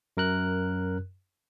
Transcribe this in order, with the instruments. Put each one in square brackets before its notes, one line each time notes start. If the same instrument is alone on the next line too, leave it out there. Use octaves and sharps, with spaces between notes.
[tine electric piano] F#2 A#4 F#6